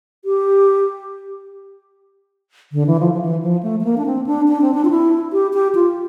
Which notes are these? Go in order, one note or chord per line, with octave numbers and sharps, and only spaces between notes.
G4
D3
E3
F3
F3
E3
F3
A3
A3
A#3
D4
C4
D4
D4
C4
D4
F4
E4
G4
G4
F4